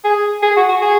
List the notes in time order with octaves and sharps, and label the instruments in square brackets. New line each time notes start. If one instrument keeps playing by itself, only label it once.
[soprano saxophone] G#4
G#4
F#4
F#4
G#4